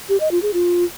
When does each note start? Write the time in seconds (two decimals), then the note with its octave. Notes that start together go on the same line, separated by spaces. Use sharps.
0.09 G4
0.20 D#5
0.31 F4
0.43 G#4
0.54 F4